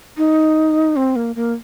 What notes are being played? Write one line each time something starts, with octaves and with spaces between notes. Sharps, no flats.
D#4
C4
A#3
A#3